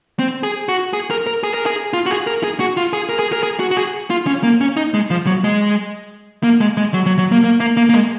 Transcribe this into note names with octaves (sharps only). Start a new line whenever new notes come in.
C4
G#4
F#4
G#4
A#4
A#4
G#4
A#4
G#4
F4
F#4
G#4
A#4
G#4
F#4
F4
G#4
A#4
G#4
A#4
G#4
F#4
F#4
G#4
F4
C#4
A#3
C#4
D#4
G#3
F3
F#3
G#3
A#3
G#3
G#3
F#3
F#3
F#3
A#3
A#3
A#3
A#3
A#3
G#3